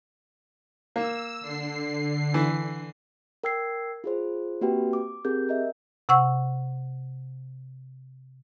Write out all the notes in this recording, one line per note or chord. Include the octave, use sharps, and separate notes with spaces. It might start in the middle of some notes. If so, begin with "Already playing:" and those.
A#3 E6
D3 C7
E3
A#4 G5 E6 G#6 C7
F4 G#4 C5
A#3 C4 F#4 G4 B4 G5
D6
C4 G4 G#4 A#4 G6
A#4 D#5 E5
C3 F#5 C#6 E6